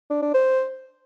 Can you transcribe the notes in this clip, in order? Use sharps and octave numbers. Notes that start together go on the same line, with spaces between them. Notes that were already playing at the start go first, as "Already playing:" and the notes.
D4
D4
C5